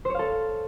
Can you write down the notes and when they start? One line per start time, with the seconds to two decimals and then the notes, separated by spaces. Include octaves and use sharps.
0.05 C5
0.10 C#5
0.14 F5
0.19 A4